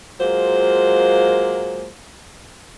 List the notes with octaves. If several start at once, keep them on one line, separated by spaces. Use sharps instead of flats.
F#3 G#3 A#3 F4 C5